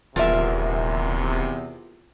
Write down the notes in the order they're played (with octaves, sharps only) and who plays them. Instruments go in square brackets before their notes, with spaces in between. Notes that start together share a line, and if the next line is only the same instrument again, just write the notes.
[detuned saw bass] D#1 [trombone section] E2 C3 [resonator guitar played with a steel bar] F4 A#4 E5